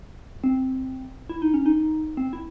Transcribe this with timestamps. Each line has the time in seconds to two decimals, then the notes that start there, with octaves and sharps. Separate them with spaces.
0.44 C4
1.29 E4
1.42 D#4
1.54 C#4
1.66 D#4
2.17 C4
2.33 E4